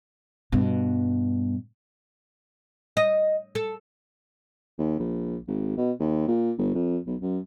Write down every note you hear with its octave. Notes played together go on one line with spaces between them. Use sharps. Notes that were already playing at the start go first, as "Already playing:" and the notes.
G2 B2
D#5
A4
D#2
A#1
G#1
B2
D#2
A#2
G1
F2
B1
F#2